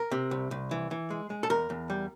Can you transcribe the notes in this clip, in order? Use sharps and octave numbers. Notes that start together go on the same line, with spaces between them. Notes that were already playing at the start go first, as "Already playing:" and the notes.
Already playing: A#4
C3
C2
C2
E3
E3
G#3
G#3
A4
E2 A#4
E2
G3